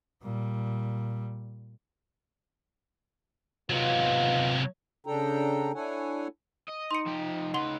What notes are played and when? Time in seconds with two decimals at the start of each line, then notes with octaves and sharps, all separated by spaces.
0.23 A#2 G3
3.70 C3 F#3 B3 D#4 F4
5.06 C#3 D4 A4 G5 A#5
5.75 D4 E4 A4 C#5 F#5 G#5
6.69 D#5
6.91 D#4 C6 C#7
7.07 F3 G4
7.54 C#3 B4 F#5 C6 G7